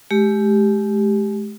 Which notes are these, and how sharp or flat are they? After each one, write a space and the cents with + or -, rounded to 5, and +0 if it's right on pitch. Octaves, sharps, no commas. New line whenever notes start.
G#3 +40 G4 +0